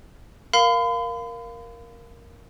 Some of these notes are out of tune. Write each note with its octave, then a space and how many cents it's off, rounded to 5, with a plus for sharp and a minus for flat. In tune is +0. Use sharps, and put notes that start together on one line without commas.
A#4 +0 F5 +0 B5 +40